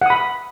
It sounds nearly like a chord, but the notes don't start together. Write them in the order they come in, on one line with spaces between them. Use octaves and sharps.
F#5 D#6 B5